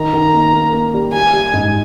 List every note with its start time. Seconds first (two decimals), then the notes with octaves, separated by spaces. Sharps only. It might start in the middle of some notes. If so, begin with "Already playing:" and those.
Already playing: D#3 A#5
0.13 D#3
0.33 A#3
0.53 A#3
0.73 A#3
0.94 G3
1.13 G3 G#5
1.33 G3
1.53 G#2